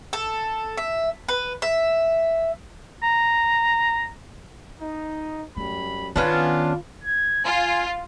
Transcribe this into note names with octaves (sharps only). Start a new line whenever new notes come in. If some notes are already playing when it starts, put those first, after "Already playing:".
A4
E5
B4
E5
A#5
D#4
F#2 G3 A3 B5
D#3 B3 C#4 D4 F4
G#6
F4 G#5